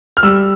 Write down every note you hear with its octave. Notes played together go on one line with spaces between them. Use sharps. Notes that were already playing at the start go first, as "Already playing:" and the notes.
F6
G3 E6